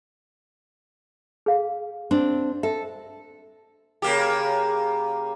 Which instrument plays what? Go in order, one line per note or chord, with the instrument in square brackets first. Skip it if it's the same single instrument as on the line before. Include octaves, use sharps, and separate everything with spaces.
[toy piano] G#4 F5
[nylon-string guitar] C4 D4
[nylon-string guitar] A4 [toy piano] E5
[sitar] C#3 A#3 G4